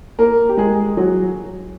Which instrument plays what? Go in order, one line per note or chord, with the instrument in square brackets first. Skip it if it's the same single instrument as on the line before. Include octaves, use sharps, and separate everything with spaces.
[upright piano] A#3 A#4
G4
G#3 G#4
F#3 F#4